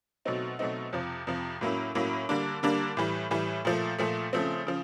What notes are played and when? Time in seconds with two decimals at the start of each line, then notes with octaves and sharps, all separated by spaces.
0.25 B2 F#3 A3 C4 D#4
0.59 B2 F#3 A3 C4 D#4
0.93 F2 C3 F3
1.27 F2 C3 F3
1.61 A2 F#3 A#3 C#4 E4
1.95 A2 F#3 A#3 C#4 E4
2.29 D3 G3 A#3 D4
2.63 D3 G3 A#3 D4
2.97 A2 E3 G3
3.31 A2 E3 G3
3.65 A#2 F3 A3
3.98 A#2 F3 A3
4.33 C#3 F3 A3 C4
4.67 C#3 F3